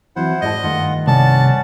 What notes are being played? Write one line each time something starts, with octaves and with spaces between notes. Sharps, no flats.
E3 F#3 C4 E4 C5 F#5
G#2 D5 D#5 A5
G2 D#3 A3 F4 F#5
C2 C#4 D5 F#5 A5